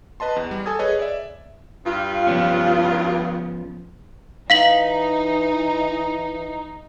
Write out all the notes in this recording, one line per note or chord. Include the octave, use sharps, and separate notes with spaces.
B4 D#5 A5 C6
E2
G3
A4 G#5 A5 D#6 G#6
G#4 B4 C#5 D#5
D5 E5
G2 F4
F3 B3 C#4
E3 D#4 F5 B6 F#7